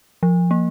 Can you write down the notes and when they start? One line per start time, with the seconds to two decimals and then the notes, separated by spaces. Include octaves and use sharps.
0.23 F3
0.51 A#3